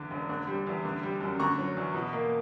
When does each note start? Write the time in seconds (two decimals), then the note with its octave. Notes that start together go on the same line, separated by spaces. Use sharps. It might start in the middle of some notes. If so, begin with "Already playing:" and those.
Already playing: E2 D3
0.11 E1
0.29 D3
0.47 G3
0.67 E2
0.85 D3
1.03 G3
1.21 F#2
1.40 D3 A#5 C#6
1.58 F#3
1.77 E2
1.94 B2
2.13 A#3